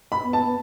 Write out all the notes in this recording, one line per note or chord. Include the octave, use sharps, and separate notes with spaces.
B5
B3
A5
B3